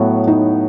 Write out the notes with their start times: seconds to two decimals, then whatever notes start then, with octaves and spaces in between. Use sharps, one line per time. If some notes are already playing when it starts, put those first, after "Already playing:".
Already playing: A2 F#3 B3
0.28 D#4